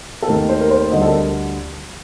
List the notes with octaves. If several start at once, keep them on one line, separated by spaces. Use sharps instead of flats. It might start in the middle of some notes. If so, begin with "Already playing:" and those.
A4
D#2 D#3 A3 A#4
C5
A#4
C5
D2 D3 G3 D#5
A4
A#4